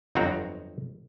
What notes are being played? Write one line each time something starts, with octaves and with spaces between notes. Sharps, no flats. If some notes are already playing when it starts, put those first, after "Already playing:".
G1 F2 F#3 C4 F#4 A#5